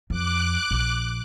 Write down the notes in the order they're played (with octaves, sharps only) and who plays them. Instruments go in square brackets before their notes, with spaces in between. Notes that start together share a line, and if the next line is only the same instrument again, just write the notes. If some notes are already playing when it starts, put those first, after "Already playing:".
[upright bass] F2 [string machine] D6 F#6
[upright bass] A#1